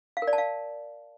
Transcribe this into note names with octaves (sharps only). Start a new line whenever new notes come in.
F5
A#4
D5
A5
F5